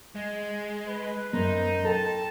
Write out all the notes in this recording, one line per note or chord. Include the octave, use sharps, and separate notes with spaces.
G#3
B4
F#2 D#4 C5
A4 G5 A5